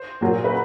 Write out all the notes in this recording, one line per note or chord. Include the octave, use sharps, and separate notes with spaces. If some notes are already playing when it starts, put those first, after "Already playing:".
Already playing: C5
A#2 F#3 A#3
B4